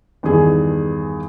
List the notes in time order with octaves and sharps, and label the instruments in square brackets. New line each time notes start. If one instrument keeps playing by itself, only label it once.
[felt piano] E2 G2 D#3 G#4 G#5